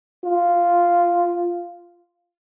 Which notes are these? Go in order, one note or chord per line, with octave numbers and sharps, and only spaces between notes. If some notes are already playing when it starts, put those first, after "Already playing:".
F4